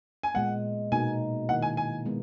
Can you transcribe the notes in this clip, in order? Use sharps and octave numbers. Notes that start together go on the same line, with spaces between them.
G#5
A#2 G#3 B3 F#5
B2 A#3 D#4 G#5
D#3 A#3 E4 F#5
G#5
G#5
G#3 B3